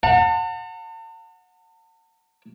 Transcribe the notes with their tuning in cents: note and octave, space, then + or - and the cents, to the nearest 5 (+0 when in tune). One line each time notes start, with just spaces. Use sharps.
F#5 -25 A5 +45